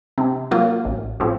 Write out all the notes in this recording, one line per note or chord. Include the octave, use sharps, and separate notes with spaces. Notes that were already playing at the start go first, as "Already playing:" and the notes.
C3
F#3 A#3 F4
A1
A2 F3 C4